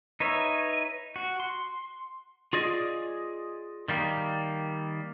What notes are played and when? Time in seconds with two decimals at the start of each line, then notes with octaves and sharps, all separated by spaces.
0.20 D#4 B4 C#5 E5
1.16 F#4
1.40 C6
2.53 F4 G#4 D5 D#5
3.88 D#3 G3 A#3